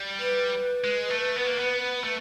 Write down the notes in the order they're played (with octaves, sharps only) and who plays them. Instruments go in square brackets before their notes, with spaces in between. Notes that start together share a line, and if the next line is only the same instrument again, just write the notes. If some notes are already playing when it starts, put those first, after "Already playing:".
Already playing: [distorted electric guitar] G3
[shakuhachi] B4
[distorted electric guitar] G#3
A3
B3
A#3
B3
A3